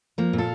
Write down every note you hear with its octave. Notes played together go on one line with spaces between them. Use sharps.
F3 A#3
A#2
F4 A4